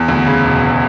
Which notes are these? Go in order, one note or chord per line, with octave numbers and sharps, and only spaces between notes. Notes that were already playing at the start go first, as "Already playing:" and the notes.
Already playing: E2
D2
C#3
E1
E1